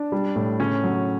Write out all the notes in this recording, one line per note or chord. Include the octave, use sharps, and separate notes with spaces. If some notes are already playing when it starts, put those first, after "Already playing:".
Already playing: D4
G3
A2
C#3 C#4
F#3